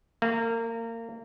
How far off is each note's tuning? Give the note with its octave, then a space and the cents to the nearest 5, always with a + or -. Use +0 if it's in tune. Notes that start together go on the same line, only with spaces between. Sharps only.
A#3 -30